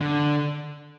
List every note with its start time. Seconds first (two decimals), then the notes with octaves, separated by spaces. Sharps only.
0.01 D3